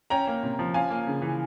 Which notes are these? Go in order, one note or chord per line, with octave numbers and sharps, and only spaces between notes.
C#4 G5 A#5
A#3
C3
F3
C#4 F5 G#5
A#3
C#3
E3